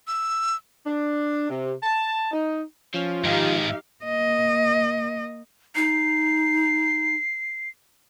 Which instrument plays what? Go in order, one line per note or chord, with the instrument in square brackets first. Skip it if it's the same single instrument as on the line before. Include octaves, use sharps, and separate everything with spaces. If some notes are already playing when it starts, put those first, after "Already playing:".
[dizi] E6
[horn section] D4
C3
A5
D#4
[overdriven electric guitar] F3 [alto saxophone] C#4
[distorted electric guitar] G#2 D#3 [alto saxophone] D#4 [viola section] G4 F5
[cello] A#3 D#5
[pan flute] D#4 [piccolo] C7